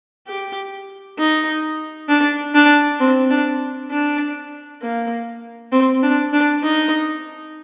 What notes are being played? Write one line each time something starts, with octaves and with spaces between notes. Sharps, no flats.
G4
D#4
D4
D4
C4
D4
D4
A#3
C4
D4
D4
D#4